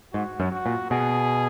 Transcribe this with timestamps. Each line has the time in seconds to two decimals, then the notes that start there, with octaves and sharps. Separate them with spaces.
0.13 G#2 F#4
0.40 F#2
0.52 F#4
0.66 A#2
0.90 B2 G#4